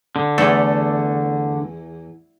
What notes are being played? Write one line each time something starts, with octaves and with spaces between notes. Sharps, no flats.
D3
E2 A3 A4